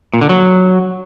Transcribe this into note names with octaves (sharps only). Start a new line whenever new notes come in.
A#2
D3
F#3